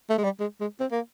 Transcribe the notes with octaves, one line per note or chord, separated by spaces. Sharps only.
A3
G#3
G3
G#3
G#3
C4
A#3